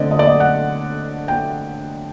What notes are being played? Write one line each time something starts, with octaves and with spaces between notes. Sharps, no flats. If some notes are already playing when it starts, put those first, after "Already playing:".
Already playing: D3 A3 C4 D5 D#5
D#5
D5
D#5
F#5
G5